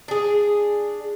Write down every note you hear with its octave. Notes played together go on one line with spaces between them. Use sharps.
D4 G#4